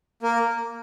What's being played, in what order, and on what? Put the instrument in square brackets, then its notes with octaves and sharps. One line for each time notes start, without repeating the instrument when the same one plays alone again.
[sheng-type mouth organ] A#3 A#4